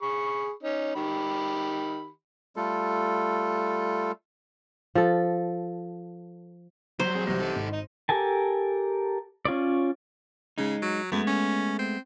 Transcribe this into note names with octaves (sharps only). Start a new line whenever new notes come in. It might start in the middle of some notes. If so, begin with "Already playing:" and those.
G#4 B5 C#6
C#4 D#4
D#3 G4 B5
G3 A3 F4 A4
F3 A4
F#3 G3 C5 A#5 C6 G6
C4 G#4
C2 C3 E3 A#6
D#4 A4
G#1
D#4
G4 A4 A#4 G#5 A5
C#4 F4 C#5 D5
C#3 G#3 D#4
F#3
F#2 G#3 A3 B3
C#4
C4